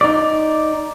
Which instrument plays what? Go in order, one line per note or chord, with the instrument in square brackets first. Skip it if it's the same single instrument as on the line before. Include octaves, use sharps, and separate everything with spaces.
[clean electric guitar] D#4 D5